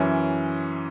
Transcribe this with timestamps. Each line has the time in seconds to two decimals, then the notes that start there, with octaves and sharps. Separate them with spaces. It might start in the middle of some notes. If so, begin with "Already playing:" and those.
Already playing: F#2 E3 C#4 E5